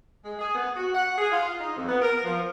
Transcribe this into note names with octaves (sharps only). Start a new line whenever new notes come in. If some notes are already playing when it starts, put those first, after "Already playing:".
G#3
G#4
B3
F#4
F#5
G#4
F4
D#4
F2
B3
A#4
F3